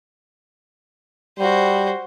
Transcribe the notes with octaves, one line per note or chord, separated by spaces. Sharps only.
G3 F#4 C5